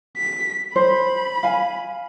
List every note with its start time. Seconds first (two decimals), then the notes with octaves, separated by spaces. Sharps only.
0.17 B6
0.76 C5 B5
1.43 F5 G#5